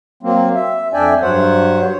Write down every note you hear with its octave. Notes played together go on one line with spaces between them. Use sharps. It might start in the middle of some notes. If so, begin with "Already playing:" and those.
F#3 A#3 C4
E5
F2 D4 D5 E5 G5 G#5
G2 F#3 C5 C#5 F#5
C#5